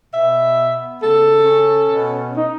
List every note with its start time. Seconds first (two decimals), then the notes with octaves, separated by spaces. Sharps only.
0.12 B2 E5
0.57 B3
1.01 C#3 A4
1.45 C#4
1.90 B2
2.34 D#4